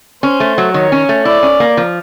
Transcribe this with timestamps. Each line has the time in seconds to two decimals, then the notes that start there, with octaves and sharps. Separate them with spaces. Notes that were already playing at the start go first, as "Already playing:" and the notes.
0.23 C#4 C5
0.40 A3
0.58 F#3
0.74 D#3 C#5
0.92 C#4
1.09 A3
1.25 E4 D5
1.43 C#4
1.60 A#3
1.77 F3